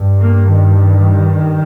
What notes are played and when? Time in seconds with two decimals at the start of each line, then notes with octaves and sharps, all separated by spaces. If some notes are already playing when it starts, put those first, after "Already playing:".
Already playing: G2
0.20 A#3
0.51 D#3